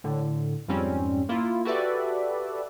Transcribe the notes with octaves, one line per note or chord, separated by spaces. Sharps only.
A2 D3
F2 G#2 G3 C4 C#4
A#3 E4 F4
F#4 G4 A4 B4 D5 E5